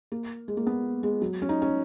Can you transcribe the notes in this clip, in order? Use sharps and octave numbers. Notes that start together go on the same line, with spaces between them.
A#3
G#3
A#3
B3
G#3
F#3
C#4
D#4
C#4